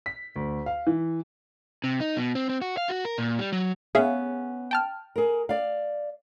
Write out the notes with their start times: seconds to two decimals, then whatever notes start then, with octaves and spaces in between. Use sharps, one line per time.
0.06 B6
0.36 D2
0.66 F5
0.87 E3
1.84 C3
2.01 D#4
2.16 B2
2.35 C4
2.49 C4
2.62 F#4
2.78 F5
2.89 F#4
3.05 A#4
3.18 A#2
3.39 G3
3.53 F#3
3.95 B3 C#4 G#4 E5 F5
4.71 G5 A5 F6
5.16 G#4 A#4
5.49 D5 F5